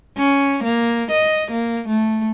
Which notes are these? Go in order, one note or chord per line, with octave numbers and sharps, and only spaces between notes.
C#4
A#3
D#5
A#3
A3